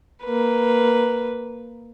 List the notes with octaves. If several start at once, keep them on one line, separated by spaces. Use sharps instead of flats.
A#3 B4